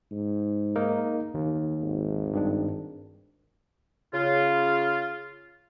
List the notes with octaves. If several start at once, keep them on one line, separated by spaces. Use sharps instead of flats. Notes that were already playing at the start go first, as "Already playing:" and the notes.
G#2
A#3 D#4 A#4
D#2
G#1
G2 D#3 D4
C#3 F4